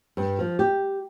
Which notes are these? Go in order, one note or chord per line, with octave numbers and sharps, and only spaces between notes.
G2
F3
G4